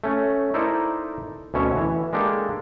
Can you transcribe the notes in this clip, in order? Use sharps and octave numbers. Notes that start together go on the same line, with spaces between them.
A3 C#4
D#4 E4 A4 A#4 C5 D5
D2 B2 C#4 C#5 E5
E3
G#3 A#3 D4 G4 A4